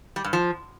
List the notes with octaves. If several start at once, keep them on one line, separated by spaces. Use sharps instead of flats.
G3
G2
F3